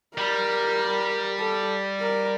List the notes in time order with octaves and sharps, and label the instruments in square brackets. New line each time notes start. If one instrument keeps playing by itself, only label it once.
[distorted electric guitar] G3 [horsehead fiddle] A#4
[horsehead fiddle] A4
A#4